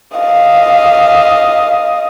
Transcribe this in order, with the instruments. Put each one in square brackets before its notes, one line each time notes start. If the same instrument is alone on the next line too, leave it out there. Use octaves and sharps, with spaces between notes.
[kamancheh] D#5 F5